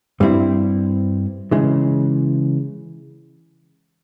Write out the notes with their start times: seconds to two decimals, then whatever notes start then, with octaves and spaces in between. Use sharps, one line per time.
0.20 G2 G3 C4 E4
1.51 C#3 E3 G#3